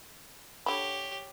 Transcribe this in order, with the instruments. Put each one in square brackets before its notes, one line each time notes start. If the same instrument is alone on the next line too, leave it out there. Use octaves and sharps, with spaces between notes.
[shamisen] D3 B5 [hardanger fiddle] G4 C#5